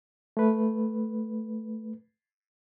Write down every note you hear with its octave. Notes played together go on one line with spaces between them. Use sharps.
A3 B4